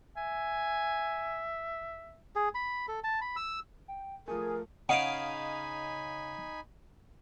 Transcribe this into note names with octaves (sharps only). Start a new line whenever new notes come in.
E5 G#5
G#4
B5
A4
A5
B5
E6
G5
F3 A3 G#4 A#4 G#5
C#3 D#4 D#5 F5 F#5 G#5 B5 D7